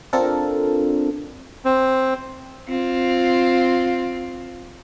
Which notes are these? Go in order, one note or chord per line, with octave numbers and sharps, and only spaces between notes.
C4 D4 F4 A4 A#4
C4
C4 F4